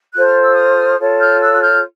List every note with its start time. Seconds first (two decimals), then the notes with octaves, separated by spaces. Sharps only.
0.13 F4 A4 C5 F#6
0.27 F6
0.40 E6
0.53 D#6 F6
0.99 F4 A4 C#5
1.19 F6 G6
1.40 E6 F#6
1.52 F#6
1.62 F6 G6